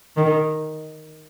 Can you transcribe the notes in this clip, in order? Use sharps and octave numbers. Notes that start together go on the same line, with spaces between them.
D#3